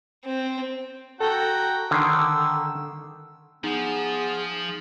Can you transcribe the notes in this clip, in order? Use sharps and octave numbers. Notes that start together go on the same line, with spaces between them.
C4
F#4 A4 G5 A#5
D3 D#3 E6
F3 B3 D#4 G#4